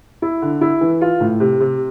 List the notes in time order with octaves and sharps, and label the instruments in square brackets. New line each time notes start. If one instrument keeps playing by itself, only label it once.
[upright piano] E4
D3
E4
E3
F4
A2
C3
C3